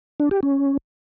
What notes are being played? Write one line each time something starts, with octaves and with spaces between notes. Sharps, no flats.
D4
G4
C#4